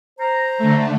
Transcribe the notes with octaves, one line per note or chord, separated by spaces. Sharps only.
C5 A#5
D3 A3